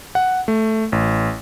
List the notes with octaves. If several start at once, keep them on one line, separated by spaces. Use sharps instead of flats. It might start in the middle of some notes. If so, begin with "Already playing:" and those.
F#5
A3
A1